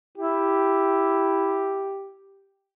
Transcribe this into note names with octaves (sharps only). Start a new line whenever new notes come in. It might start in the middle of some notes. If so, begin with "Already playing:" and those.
E4 G4